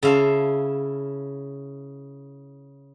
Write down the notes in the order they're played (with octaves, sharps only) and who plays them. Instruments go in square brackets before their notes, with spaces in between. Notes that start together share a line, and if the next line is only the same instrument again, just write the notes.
[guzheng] C#3 E4 F5 A5 C6